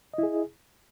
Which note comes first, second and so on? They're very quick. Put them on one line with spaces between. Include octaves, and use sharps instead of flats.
D#5 E4 G#4